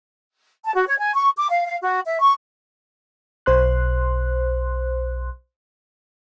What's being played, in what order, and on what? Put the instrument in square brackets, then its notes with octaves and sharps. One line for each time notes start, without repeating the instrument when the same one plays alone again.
[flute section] A5
F#4
C#5
G#5
C#6
D6
F5
F5
F#4
E5
C#6
[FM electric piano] B1 C5 C6 F#6